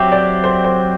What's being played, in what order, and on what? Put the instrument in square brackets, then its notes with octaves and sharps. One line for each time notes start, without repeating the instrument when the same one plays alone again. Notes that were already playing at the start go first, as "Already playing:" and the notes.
Already playing: [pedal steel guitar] F#3 C4 G4 [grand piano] E5
[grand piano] D5
C5
C5